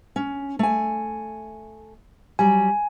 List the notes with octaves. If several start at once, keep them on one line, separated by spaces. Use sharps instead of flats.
C#4
A3 G#5
F#3 G3 G#5